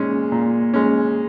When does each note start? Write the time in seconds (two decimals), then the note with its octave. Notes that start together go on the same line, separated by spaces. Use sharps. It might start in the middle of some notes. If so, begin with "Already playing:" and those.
Already playing: A#2 G#3 C#4
0.32 A#2
0.74 G#3 C#4